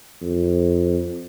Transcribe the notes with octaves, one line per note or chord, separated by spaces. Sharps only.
F2